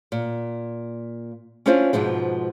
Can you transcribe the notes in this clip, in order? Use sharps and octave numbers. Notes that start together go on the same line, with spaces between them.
A#2
C#4 D4 E4 F4 C5 D5
G#2 B2 F3 G#3